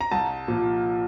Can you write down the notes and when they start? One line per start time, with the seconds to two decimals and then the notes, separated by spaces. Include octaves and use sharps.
0.01 A#5
0.12 C2 A5
0.48 A#2 F3